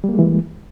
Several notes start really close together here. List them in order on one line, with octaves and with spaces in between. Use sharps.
G3 A#3 G#3 E3